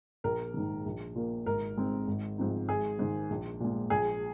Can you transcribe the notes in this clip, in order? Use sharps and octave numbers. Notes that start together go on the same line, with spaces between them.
A#1 A#4
G#2 D#3
A#1
A#2 A#3
G#1 A#4
G#2 G#3 C4
G#1
G#2 F3 C4 D#4
G#1 G#4
G#2 D#3
A#1
A#2 G#3
A#1 G#4